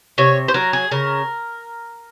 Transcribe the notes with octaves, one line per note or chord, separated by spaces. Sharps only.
C3 C#5
C5
F#3 A#4
G#4
C#3 A#4